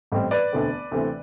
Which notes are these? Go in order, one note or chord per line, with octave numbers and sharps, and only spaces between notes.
A1 A2 G3 C4
B4 D5
E1 D2 D3 A3 C4
D2 C3 E3 A3 C4